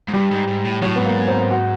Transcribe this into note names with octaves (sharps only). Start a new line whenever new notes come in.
G#2
G2 G3
G#2
G#2
A2
A2 F#3
G#2 B3
A#3
A#3
C4
F#4